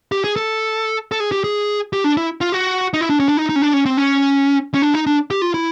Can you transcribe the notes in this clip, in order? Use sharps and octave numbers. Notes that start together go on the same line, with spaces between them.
G4
G#4
A4
A4
G#4
G4
G#4
G4
D4
E4
F4
F#4
D#4
E4
D4
C#4
D4
D#4
D#4
C#4
D4
C#4
C4
C#4
C#4
D4
D#4
D4
G4
F4
E4